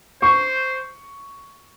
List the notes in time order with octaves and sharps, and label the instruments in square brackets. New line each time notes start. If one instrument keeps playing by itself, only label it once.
[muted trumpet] C5 [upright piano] C#6